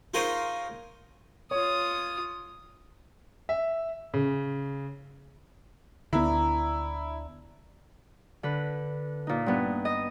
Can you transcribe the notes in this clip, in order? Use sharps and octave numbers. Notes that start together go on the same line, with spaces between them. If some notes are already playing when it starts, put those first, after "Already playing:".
D#4 F4 G#4 A#4 C5 C#5
F4 C#5 D#6
E5
C#3
D2 D3 B3 D4 E4 A#5
D3 B4
A#2 D#4
G2 B3
D#5